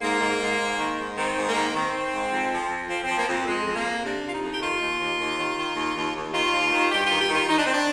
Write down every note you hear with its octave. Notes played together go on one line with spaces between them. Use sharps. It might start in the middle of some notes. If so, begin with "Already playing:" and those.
G#2 A#3
G#2
G#2
G#2
D#3
G#2
D#3 C4
G#2
A#3
D#3
D#3 C4
D#3
G#2
F2
F3
F2
F3 C4
C4
F3
A#3
F2 C4
F2 G#3
F2
A#3
F2
C3 D4
C3
F4
D#4
F2
G4
D#3 F4
D#2
D#2
D#2
D#3
D#3
D#2
D#2
D#2
D#3 F4
D#2
D#3
G2 G4
D#3 F4
G4
D#3 F4
D#3 D#4
D4
D#3 C4
D4